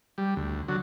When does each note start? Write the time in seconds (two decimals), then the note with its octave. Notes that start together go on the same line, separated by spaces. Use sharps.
0.18 G3
0.36 D2
0.68 D3 F#3